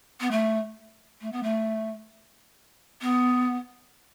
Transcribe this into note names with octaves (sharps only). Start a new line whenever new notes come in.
B3
A3
A3
B3
A3
B3